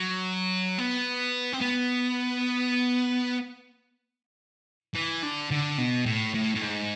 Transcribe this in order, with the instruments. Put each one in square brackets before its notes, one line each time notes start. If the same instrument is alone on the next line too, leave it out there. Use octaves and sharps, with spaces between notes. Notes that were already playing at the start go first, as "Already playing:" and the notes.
Already playing: [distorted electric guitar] F#3
B3
C4
B3
E3
D3
D3
B2
A2
A2
A2
G#2